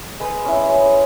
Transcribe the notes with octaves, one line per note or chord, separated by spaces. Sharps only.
G#3 B4
C#4 E4
G#3